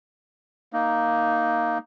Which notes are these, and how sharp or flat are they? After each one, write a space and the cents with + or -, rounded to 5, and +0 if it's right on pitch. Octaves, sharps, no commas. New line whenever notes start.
A#3 +0 D#4 +0